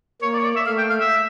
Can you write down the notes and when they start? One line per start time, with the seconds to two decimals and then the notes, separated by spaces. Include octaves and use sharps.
0.22 A#3 C#5
0.33 D5
0.39 C#5
0.44 D5
0.56 E5
0.66 A3 F5
0.78 G5
0.90 F5
1.00 E5